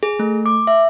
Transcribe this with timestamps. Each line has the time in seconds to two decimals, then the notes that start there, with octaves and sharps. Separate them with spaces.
0.03 G#4
0.19 A3
0.46 D6
0.67 E5